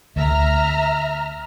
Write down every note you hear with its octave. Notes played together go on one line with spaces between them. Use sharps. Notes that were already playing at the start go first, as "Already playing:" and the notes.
D2 E5 A#5 F6